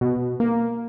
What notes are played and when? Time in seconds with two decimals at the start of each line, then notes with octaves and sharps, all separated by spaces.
0.01 B2
0.40 A#3